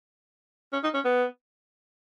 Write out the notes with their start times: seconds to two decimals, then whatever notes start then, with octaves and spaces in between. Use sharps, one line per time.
0.73 C#4
0.84 D#4
0.94 C#4
1.05 B3